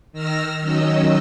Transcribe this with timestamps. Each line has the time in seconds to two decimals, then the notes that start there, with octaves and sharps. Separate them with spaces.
0.13 D#3 E6 F6 A#6
0.60 D#3 F#3 C#4 D#5 E6